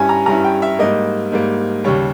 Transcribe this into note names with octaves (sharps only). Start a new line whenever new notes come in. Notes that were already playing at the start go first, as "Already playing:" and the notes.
Already playing: G2 G3 C#4 E4 G#5
A#5
G2 G3 C#4 E4 A#5
G5
E5
G#2 G3 A#3 D#5
G#2 G3 A#3
D#2 C#3 G3 C#5